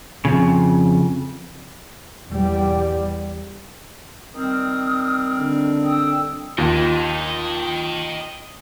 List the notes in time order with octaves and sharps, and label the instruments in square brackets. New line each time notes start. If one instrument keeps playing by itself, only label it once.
[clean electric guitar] F2 C#3
[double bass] E2 G3
[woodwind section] D#3 G3 C4 [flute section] D#6 F6
[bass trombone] D3
[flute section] G5 D#6 E6
[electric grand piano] D#2 F4 A#6 [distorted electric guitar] D#5 G5